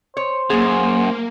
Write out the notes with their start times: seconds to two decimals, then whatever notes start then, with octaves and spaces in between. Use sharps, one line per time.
0.17 C5 C#5
0.50 F#2 A#3 G#4